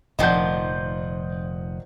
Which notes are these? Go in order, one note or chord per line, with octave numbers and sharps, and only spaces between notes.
F1 A#2 D#3 F3 D#5 F#5 G6